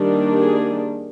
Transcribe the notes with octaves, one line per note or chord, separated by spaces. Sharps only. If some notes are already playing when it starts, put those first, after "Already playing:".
Already playing: D#3 G3 A#3 D4
G#4